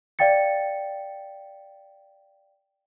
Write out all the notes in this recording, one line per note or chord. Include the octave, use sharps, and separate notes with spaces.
D5 F5 G5 A6 C#7